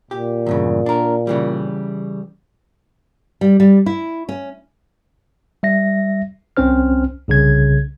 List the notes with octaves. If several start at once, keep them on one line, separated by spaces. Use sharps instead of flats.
A#2 G4
E2 G2 C#3
D4 A#4
C#3 E3 G3
G3
G3
E4
C#4
G3 E5 A#6
C2 C4 C#4 C5 F6
C2 C#3 G#6